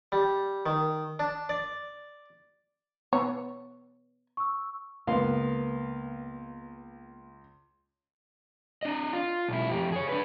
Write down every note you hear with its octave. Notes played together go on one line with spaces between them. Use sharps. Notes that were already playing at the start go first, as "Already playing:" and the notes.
G3
D#3
D4
D5
B3 C#5
C#6 E6
C#2 A#3 B3 F5 C6
D4 D#5
F4
B1 E4
F2 G4
G#4 C#5
D4 B4